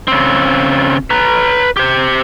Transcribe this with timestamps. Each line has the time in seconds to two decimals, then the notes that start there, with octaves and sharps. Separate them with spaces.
0.08 C#3 C4
1.10 B4 A#5
1.77 G4 C5